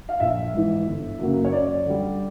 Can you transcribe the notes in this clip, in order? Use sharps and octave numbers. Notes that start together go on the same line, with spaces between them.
F5
A#1 E5
G#2 E3
G1
F#2 C#3 F#3 A#3
C#5
F#2 D5
D3 G3